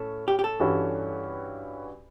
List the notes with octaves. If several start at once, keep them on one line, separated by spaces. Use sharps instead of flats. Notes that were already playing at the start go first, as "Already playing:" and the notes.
Already playing: A2 C#4 A4
G4
G4
A4
G2 E3 G3 C#4 F#4